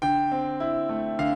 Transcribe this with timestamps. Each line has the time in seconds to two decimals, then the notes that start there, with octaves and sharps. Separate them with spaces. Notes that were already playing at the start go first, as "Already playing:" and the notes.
0.02 D3 G5
0.32 C4
0.60 E4
0.89 A3
1.19 D3 F5